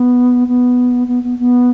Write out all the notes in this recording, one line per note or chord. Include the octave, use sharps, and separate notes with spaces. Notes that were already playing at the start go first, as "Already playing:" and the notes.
Already playing: B3
B3
B3
B3
B3